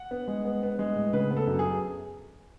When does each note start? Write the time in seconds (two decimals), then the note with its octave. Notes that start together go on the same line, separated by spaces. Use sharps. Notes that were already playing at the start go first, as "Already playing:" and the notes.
Already playing: F#5
0.11 B3
0.28 G#3
0.45 B3
0.63 B3
0.79 G#3
0.96 A2
1.13 C#3 B4
1.31 B3
1.37 A4
1.47 F#2
1.59 G#4